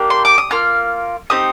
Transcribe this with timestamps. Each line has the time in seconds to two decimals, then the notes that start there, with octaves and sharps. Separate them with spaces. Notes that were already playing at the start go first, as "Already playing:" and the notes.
Already playing: A#3 D4 G4
0.10 C6
0.25 D6
0.38 D#6
0.51 A#3 F4 F6
1.30 C4 D#4 G4 D#6